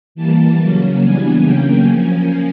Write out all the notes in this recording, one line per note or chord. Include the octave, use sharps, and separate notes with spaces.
E3 G3 A#3 A5
C#3 F#3 A#3 C#4
E3 G3 B3 D4 G#5
C#3 F#3 A#3 C#4 G5
F3 A#3 C#4 G#5